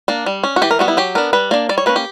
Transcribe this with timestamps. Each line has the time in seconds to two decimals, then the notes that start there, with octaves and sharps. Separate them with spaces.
0.08 A#3 D4
0.26 G3
0.44 C#4
0.56 F#4
0.62 E3 G4
0.71 A#4
0.79 G3 B3 F#4
0.88 E4
0.97 F#3 G4
1.15 B3 D4 A#4
1.33 G3 B4
1.51 A#3 D4 D5
1.69 G3 D5
1.78 C#5
1.86 A#3 C#4 B4
1.96 G4